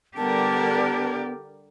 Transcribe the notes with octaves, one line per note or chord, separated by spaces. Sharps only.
D3 G3 B3 G4 A#4 D5 A5